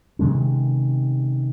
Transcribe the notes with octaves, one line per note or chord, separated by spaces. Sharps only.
C3 D#3 G#3 C#4